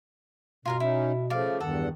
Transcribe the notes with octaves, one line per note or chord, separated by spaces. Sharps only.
G2 B2 F4 A#4 F5
C#4 D#4 E4
C#3 F3 A3 D5 F5
E2 G2 D#3 A4 F#5